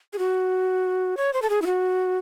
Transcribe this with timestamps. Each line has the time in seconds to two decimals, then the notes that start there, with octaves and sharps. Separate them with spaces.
0.13 G#4
0.18 F#4
1.17 C#5
1.33 C5
1.42 A4
1.50 G#4
1.62 E4
1.66 F#4